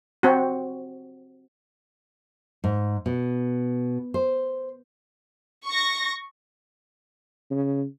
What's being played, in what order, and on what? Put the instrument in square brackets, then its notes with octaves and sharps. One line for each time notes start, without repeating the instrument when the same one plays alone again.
[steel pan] C4 F#4
[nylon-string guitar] G#2
B2
C5
[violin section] C#6 A#6
[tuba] C#3